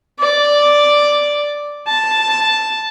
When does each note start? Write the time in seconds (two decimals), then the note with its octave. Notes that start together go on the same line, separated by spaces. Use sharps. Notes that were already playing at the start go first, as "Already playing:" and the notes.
0.19 D5
1.87 A5